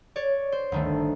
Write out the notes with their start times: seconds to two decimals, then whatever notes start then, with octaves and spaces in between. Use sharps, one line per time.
0.16 C#5 D5
0.52 C5
0.72 G1 D2 D#3 A3
0.90 A1